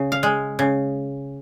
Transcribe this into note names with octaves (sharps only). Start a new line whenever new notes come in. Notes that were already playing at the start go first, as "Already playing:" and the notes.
Already playing: C#3
F5
G#3
C#3